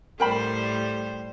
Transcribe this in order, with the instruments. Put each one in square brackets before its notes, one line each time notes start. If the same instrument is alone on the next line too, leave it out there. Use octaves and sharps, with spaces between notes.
[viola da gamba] A2 G3 C5 [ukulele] A#4 G5 B5